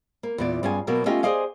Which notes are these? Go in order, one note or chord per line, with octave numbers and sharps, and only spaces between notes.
A#3
E2 A#2 D5
G2 B3 C#4 F4 G#4 G#5
B2 F#3 A#3 B3
A3 C#4 F4 G4 D#5 F5
G#4 C5 D5 D#5 F5 G#5